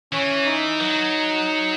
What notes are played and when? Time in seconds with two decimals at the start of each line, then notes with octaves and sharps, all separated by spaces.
0.13 E3 C#4
0.46 D#4
0.80 F#3